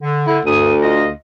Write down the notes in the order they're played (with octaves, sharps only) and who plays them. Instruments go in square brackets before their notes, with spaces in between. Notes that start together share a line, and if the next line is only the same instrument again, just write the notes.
[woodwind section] D3
[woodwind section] D3 [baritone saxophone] E4
[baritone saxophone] D2 [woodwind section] G2 D#6
[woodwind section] F4 D#5